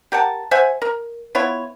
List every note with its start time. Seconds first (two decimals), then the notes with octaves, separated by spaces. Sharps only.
0.12 G4 A#4 F#5 A5
0.51 C5 E5 F#5 G#5
0.82 A#4
1.35 B3 E4 F4 C#5